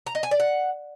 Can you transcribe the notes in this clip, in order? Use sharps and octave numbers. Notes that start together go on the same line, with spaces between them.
A#5
D#5
G#5
D5
F#5